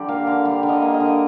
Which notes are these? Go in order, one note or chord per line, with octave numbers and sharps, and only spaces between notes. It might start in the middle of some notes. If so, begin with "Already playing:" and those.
Already playing: D3 G3 G4
A#3 F5
D3
G3 F5
D3
D#5
A#3
D#5
D3